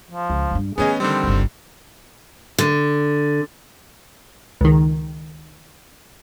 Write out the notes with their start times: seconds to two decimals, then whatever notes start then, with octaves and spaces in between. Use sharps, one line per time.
0.11 F3
0.30 C#2
0.51 G2 G3
0.78 E3 A3 B3 C#4 G#4 D#5
1.00 D3 D#3 G3 C4
1.24 G1 C#2
2.58 D3
4.61 C#2 D#3